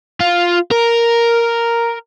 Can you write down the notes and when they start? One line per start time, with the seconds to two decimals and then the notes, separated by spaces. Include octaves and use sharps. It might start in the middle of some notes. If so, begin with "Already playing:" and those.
0.20 F4
0.71 A#4